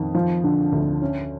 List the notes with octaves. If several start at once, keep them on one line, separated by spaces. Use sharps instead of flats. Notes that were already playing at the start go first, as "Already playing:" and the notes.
Already playing: F2 D#3
F3
D3
D2
C#4